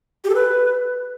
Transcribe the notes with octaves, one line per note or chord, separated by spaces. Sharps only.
G4
A4
B4